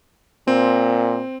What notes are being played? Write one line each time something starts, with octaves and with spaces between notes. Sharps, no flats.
A#2 C4